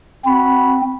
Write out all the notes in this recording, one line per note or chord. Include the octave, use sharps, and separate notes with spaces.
C4 F#4 B5